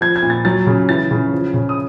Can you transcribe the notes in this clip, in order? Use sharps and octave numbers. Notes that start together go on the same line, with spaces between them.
F3 G#6
G#6
A#2
A6
F#3 A6
C#3
E3 A6
C#3
F3
C#3
D#6